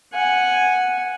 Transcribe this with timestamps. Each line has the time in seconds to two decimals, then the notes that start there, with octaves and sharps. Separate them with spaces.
0.13 F#5 G#5